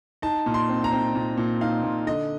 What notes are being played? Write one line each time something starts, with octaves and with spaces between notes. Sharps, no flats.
D#4 A5
A#2
C6
C4
A#5
C4
A#2
A#2
D#4 F5
A#2
D3 D#5